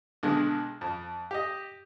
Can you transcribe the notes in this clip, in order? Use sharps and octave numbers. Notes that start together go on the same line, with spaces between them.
B1 D3 G#3
F2
G4 D#5